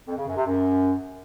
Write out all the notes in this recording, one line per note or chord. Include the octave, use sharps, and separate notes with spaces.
F2
C#3
F#2
C3
F#2